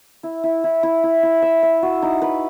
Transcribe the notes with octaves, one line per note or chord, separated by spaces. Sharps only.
E4
E4
E4
E4
E4
E4
E5
E5
F#4
D#4
B4